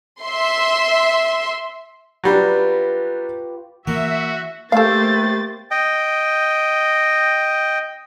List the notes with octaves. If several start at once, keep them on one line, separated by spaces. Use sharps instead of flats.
E5 C6
F#3 G3 D4 F4 G4 B4
E3 A#3 F#4 E5
A3 A#3 G4 A4 C5 F5 A6
D#5 G5